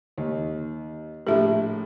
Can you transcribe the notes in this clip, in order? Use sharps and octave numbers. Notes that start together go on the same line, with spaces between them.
D#2
A#1 A2 G4 E5